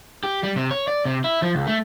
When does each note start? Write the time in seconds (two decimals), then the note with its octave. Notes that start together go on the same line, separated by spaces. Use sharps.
0.23 G4
0.43 G3
0.56 C3
0.71 C#5
0.88 D5
1.05 C3
1.24 E4
1.42 F3
1.55 C#2
1.67 A3